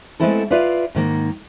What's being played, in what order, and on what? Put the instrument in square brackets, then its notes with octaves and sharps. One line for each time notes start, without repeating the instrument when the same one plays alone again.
[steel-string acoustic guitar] G#3 A3 B3 C4 E4 A4
F4 B4 D5 E5 F5
G#2 D#3 A#3